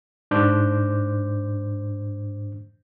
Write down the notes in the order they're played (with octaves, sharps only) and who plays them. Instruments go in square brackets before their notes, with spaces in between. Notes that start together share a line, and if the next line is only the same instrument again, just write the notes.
[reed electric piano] G#2 D4 C5 D6 G6